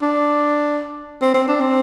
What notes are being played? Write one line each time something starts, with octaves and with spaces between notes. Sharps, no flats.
D4
C4
C4
D4
C4